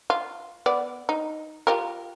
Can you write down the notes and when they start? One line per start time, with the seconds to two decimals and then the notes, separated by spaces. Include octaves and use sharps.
0.10 F4
0.66 B3 D5
1.09 D#4
1.67 F4 G4 A#4